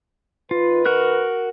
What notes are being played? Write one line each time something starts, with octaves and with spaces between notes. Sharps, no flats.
D#3 F4 B4
F#4 A#4 F#6